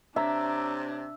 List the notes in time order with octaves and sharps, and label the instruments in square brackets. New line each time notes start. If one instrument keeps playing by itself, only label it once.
[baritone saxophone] C3 [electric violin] D4 [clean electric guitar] C#5 A#5 [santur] E5